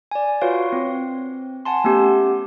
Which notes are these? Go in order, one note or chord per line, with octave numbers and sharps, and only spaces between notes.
D5 G#5
F4 F#4 B4 C#5 F5
C4
F#5 G#5 A5 C6
A3 B3 C#4 G4